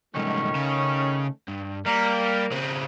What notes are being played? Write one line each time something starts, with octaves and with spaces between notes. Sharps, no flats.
C2 G#2 D#3 A3 C#4
C#3
G2
G3 A#3
C#3 C4